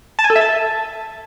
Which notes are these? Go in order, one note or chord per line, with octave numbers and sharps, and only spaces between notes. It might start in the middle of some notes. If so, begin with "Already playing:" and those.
A5
G#5
A4
E5
A5